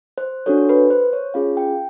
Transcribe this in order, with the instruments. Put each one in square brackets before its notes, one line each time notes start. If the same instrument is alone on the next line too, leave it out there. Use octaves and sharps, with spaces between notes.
[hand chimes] C5
D4 F#4 A4 C#5
B4
C5
C#5
C#4 F4 G#4 F5
G5